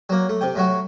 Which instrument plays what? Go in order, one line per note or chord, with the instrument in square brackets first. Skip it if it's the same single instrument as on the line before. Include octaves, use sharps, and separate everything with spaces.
[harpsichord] F#3 A#3
A3
C3 G5
A2 F#3 F#4